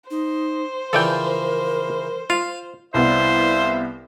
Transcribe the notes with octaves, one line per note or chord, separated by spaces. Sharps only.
D#4 C5
C#3 E3 F3 A4 A#4 D5 G5
F4 F5
C2 G3 B3 E4 C5 E5 F5